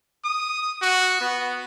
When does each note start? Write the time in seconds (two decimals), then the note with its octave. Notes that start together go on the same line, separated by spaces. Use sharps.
0.24 D#6
0.82 F#4
1.21 B3